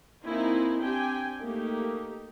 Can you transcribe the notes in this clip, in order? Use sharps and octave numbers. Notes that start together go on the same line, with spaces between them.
A#3 C4 D#4 E4 G#5
C4 D4 G4 G5 G#5
A3 A#3 D#4 G4